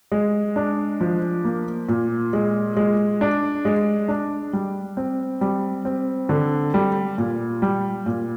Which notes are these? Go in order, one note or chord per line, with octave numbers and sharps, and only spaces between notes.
G#3
D4
F3
A#3
A#2
G#3
G#3
D4
G#3
D4
G3
C4
G3
C4
D3
G3
A#2
G3
A#2